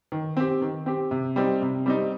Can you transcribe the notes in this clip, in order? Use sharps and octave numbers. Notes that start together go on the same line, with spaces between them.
D#3
C4 G4
D#3
C4 G4
C3
G3 C4 D#4
C3
G3 C4 D#4